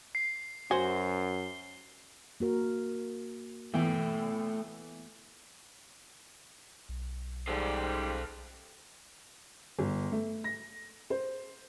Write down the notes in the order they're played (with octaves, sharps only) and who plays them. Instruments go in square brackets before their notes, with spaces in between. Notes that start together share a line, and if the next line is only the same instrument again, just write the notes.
[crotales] C7
[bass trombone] F#2 [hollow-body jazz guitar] F#4 C5 [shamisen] G#5 [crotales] G7
[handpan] A#3 F#4 A#4
[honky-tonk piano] E3 B3 [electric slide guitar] A3 G5
[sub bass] B1
[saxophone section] G#2 G3 [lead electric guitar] A4 C5
[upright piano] G1
A3
A#6
C5